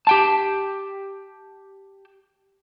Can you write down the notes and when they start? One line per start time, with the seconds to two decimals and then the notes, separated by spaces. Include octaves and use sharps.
0.07 G4 G5 A5